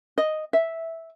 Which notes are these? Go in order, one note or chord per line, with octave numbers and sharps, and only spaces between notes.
D#5
E5